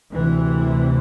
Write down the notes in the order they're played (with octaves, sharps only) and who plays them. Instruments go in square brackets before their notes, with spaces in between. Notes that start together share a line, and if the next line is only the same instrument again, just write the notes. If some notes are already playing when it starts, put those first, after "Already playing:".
[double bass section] D2 C3 E3